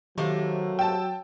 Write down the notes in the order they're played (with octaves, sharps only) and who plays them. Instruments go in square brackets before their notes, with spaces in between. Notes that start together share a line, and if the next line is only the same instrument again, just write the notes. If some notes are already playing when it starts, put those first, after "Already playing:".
[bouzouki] C3 A3 A#3 [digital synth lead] D#3 [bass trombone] F#3
[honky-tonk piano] G5 A5 [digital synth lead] E6